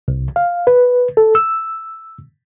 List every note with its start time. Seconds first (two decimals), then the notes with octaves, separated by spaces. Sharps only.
0.08 C2
0.36 F5
0.67 B4
1.17 A4
1.35 E6